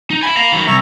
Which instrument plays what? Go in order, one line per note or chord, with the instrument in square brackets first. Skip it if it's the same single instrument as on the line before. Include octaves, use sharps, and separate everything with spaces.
[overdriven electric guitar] D#4
[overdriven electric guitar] E4 G#5 [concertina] B5
[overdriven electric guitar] F5 A#5
D#3 F#3
[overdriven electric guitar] C2 [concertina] E5 A#5 C#6